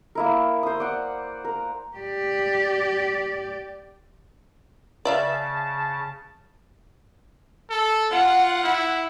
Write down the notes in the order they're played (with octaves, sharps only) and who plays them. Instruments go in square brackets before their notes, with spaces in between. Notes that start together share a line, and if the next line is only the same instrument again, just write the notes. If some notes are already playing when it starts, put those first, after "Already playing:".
[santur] A#3 E4 A#4
C5 D#6
D5 F#5
A#4
[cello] G4 D5
[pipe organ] C#3 A5 [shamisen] D5 E5 F5
[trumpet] A4
[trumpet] F4 [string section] F#5
[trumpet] E4